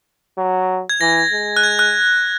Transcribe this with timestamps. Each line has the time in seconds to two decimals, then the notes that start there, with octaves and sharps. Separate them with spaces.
0.37 F#3
0.89 G#6
1.01 E3 A#6
1.32 G#3
1.57 F#6
1.64 G#6
1.79 F#6